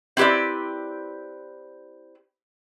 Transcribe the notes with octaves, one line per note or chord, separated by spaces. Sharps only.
C4 E4 G4 B4 D5